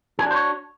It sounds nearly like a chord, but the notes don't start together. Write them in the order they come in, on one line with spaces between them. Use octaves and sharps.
G#4 D4 F#4 C5 C#5